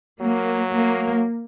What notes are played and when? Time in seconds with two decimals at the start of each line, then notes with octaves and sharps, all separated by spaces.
0.21 F#3 A#3
0.75 A#3